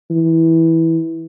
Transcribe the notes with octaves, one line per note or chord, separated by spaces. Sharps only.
E3